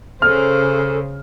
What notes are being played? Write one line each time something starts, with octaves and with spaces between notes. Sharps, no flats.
C#3 A4 C5 F6